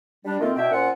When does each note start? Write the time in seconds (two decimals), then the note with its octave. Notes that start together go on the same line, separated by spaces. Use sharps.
0.25 G3 D4
0.40 D#3 A3 A#3 C4 F4
0.56 B2 D4 E4 E5 G5
0.71 A#2 C4 C#4 F4 F#5